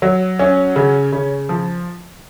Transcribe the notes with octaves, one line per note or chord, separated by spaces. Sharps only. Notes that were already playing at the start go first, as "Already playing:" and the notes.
F#3
C#4
C#3
C#3
F3